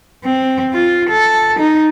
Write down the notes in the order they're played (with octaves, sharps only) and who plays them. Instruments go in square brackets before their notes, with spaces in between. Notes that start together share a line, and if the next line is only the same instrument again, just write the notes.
[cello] C4
F4
A4
D#4